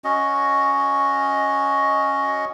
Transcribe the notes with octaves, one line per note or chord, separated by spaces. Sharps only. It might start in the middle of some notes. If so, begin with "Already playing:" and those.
C#4 F#4 D#5